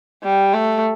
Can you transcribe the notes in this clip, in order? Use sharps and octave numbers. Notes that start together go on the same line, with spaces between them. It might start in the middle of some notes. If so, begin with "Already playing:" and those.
G3
A3